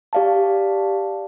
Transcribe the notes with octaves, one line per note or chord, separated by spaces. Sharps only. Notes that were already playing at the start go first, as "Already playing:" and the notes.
G4 D5 F5 A5